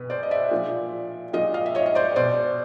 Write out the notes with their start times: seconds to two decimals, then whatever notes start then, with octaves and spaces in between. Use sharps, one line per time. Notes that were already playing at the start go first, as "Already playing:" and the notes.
Already playing: B2 B4
0.10 C5 D5
0.23 D#5
0.31 D5 E5
0.51 A#2 F3
1.33 A#2 F3 D#5 F5
1.54 D#5 F5
1.66 E5
1.75 C#5 D#5
1.86 D#5
1.95 C5 D5
2.16 B2 C5 D5